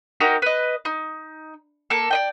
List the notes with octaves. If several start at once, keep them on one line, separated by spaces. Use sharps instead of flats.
D#4 F#4 G4 A#4
B4 D#5
D#4
A#3 A4
D5 D#5 G5